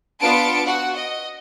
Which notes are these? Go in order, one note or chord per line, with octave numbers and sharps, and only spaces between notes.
B3 D4 F4 A5 C#7 D7
F#4 F#5
D#5